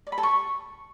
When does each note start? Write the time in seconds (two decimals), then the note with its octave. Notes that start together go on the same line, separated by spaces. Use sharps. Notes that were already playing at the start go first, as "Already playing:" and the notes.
0.07 D5
0.12 B5
0.18 A4
0.23 C#6